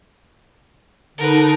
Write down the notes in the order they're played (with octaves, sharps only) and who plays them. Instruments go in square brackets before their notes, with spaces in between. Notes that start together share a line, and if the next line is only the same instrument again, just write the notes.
[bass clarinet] D3 [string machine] D#4 A5 [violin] A#4 B4